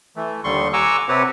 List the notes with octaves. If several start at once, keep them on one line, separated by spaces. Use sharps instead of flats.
E3 A3
D#2 D3 G3 C6 C#6
F#5 G#5 A#5 C#6 D6 E6
C3 C4 G4 B4 C#5 F#5